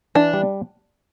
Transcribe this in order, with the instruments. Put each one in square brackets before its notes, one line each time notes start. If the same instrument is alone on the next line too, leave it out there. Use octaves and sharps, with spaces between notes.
[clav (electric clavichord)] E3 [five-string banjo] D4
[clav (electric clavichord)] G3